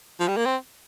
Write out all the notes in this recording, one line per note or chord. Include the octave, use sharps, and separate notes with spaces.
F3
G3
A#3
C4